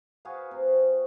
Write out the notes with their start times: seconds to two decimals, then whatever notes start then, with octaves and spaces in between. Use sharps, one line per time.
0.25 F#4 G#4 B4 F5
0.51 C3